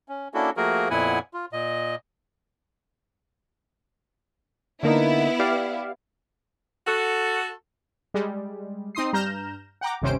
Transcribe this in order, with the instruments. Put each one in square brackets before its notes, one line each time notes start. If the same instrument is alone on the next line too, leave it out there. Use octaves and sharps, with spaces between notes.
[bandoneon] C#4
A#3 C#4 D4 E4 F#4 A4
F3 A3 A#3 F#4 G#4 A#4
F2 A#2 B3 E4 F#5 G#5
F4
A#2 D#5
[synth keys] D3 A#3 D#4 [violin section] B3 E4
[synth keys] G4 D5 F5
[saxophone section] F#4 A4
[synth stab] G3 G#3
C4 D#4 C6 D#6 C7
G2 A#5 F6 G6 A#6 E7
F#5 G5 A#5 D6
G1 D#2 C3 C#4 C5 D7